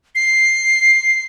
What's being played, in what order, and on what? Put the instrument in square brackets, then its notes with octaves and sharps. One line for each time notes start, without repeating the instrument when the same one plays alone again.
[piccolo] C7